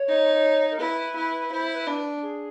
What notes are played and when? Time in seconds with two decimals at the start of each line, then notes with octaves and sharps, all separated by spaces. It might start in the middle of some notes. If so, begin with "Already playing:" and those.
Already playing: C#5
0.08 D#4
0.71 A#4
0.80 E4 B4
1.16 E4
1.51 E4 C5
1.75 B4
1.87 D4
2.22 G#4